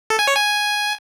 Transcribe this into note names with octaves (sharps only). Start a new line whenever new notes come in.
A4
G#5
C#5
G#5